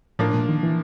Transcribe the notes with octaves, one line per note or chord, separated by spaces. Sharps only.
A2 F3 A#3 D4
A#2
D#3
E3